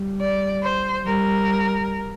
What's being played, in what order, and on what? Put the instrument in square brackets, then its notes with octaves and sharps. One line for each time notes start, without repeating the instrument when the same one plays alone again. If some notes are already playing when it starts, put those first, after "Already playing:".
Already playing: [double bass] G3
[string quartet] D5
C5
[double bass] G3 [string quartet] A#4